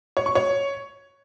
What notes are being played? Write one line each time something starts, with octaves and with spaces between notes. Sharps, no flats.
C#5
C#6
C#5